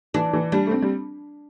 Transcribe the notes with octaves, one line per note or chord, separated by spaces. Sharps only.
E3 D4
E3
G3 D4
A3
C4
G3